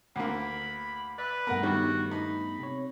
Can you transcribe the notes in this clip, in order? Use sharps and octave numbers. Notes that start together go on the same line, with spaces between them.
D2 A#3 B5
B4 D5 E5
G2 A3 B3 A#4 F#5
D#3 G3 F#4
D#4 B5
C3 C#5